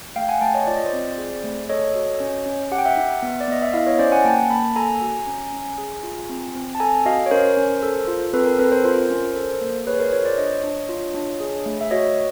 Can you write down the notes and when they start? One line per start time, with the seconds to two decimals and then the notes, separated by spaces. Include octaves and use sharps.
0.16 A3 F5 G5
0.29 F#5 G#5
0.41 A3 G5 A5
0.54 C#5 D#5
0.67 F4 D5
0.76 D#5
0.86 C5 D5
0.93 C4
1.18 G#4
1.44 A3
1.69 A4 C#5 D#5
1.95 F#4
2.20 C#4
2.46 C#4
2.72 G4 F#5
2.78 G5
2.85 E5 F#5
2.97 D#4
3.22 B3
3.41 D5
3.48 B3 D#5
3.62 E5
3.74 E4 D#5 F5
3.86 C#5 D#5
3.99 C#4 C5 D5
4.12 F#5 G#5
4.24 A#3 G5 A5
4.50 A#3 A5 B5
4.76 A4 G#5 A#5
5.01 F#4
5.27 C#4
5.53 C#4
5.78 G#4
6.03 F4
6.29 C4
6.55 C4
6.75 A5
6.80 A4 G#5 A#5
7.06 F#4 D#5 F5
7.26 C#5
7.31 C#4 A#4 C5
7.57 C#4
7.83 A4
8.08 F4
8.34 C4 A4 B4
8.46 A#4
8.59 C4 A4 B4
8.72 A#4 C5
8.85 F4 A#4 C5
9.10 C#4
9.36 A4
9.61 A#3
9.87 G#4 B4 C#5
9.99 A#4 C5
10.12 F4 B4 C#5
10.25 C5 D5
10.38 D4 C#5 D#5
10.64 D4
10.89 F4
11.14 D4
11.40 G#4
11.66 A3
11.81 E5
11.91 F#4 C#5 D#5